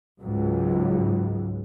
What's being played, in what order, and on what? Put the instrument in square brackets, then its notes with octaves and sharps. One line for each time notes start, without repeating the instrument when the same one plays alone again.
[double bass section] C#2 G#2 F#3